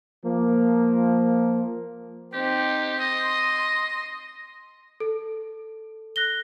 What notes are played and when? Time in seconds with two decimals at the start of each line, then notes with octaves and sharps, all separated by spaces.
0.25 F3 A#3
2.33 C4 D#4 G4
2.99 D#5 C6
5.00 A4
6.16 F#6 A#6 G7